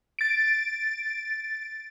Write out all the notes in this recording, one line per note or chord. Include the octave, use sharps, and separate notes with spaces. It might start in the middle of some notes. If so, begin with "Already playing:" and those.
A6 D7